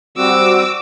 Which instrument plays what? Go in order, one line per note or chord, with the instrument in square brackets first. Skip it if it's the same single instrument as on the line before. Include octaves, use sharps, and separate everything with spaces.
[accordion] G3 C4 F#4 [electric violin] D6 E6